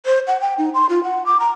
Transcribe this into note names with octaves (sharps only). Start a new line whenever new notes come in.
C5
F#5
G5
D#4
C6
F4
F#5
D6
A#5